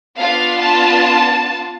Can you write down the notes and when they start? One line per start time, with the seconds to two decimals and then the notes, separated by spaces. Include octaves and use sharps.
0.16 B3 D4 F4 F5
0.61 A5